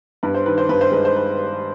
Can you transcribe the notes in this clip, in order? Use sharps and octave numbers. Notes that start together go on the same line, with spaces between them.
G2 B4
C5
D#3 B4
C5
G2 B4
C5
G#3 B4
C5
B4